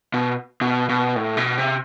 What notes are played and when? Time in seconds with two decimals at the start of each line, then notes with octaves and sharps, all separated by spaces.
0.14 B2
0.61 B2
0.89 B2
1.16 A2
1.37 B2
1.58 C3